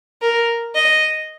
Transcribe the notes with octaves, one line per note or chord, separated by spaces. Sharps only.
A#4
D#5